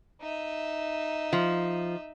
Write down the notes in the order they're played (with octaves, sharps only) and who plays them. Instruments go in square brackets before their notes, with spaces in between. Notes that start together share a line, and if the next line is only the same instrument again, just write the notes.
[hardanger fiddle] D#4 E5
[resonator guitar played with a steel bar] F3